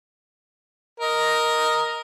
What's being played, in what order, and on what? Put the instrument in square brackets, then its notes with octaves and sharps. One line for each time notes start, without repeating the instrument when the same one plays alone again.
[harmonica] A#4 D#5